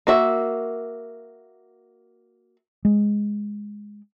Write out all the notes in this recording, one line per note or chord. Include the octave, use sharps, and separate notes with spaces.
A#3 F#4 E5
G#3